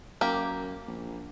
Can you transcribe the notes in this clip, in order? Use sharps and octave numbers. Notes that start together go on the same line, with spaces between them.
F#2 A#3 G4
A#1